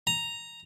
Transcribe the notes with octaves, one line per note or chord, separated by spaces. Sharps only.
A#5